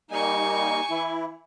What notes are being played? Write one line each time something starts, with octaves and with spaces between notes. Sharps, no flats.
G3 A#3 D#4 G#5 C#6
E3 E4